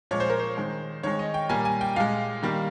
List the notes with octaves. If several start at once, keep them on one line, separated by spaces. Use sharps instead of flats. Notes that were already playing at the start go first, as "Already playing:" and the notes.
A#2 F3 G#3 C#5
C5
A#4
C5
D#3 G#3
D#3 G#3 C#5
D#5
G5
A#2 G3 A#3 G#5
G#5
G5
A#2 G#3 F5
D#3 G3 A#3